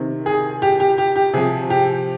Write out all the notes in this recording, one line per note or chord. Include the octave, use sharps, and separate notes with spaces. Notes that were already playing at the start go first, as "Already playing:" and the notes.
Already playing: C3 D#3
G#4
G4
G4
G4
G4
C3 F3 G#4
G4